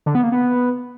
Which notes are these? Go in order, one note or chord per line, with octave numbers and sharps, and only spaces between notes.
D3
B3
A#3
B3